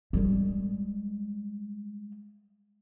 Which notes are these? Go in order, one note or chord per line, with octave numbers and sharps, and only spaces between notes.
G3 G#3